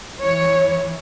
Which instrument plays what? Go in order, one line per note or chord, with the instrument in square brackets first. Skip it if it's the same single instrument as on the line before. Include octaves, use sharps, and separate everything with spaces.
[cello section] E3 C#5